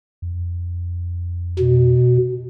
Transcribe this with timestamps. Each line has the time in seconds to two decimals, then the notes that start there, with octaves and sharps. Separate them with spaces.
0.22 F2
1.59 B2